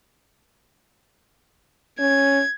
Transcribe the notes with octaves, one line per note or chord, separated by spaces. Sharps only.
C#4 G#6